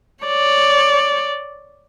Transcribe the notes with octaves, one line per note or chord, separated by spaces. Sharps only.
C#5 D5